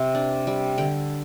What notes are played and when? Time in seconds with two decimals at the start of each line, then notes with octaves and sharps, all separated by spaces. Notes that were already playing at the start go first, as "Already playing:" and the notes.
Already playing: C3 C6
0.15 D4
0.47 G3
0.78 D3 G5